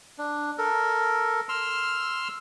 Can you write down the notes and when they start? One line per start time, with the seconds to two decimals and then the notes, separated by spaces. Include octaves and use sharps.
0.18 D4
0.58 A4 A#4
1.49 C6 E6 F6